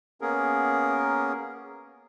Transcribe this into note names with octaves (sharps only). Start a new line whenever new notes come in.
A#3 B3 C#4 G#4 A#4